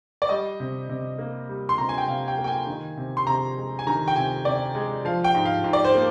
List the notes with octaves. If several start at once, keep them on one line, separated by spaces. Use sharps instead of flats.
D5
G3 D#5
C3
C3
A#3
G3
C6
C3 A#5
G#5
G5
C3 F5
G5
A#3
G5
G#5
D#3
C3
C6
C3 A#5
G#3
G#5
D#3 A#5
G5
C3 G#5
C3 D5
G#3
F3 F5
G5
G#2
F5
G#2
D5
C5
A#3